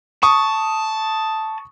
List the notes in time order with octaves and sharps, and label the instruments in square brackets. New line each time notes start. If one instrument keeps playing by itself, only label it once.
[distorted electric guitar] A5 [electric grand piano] C#6 D#6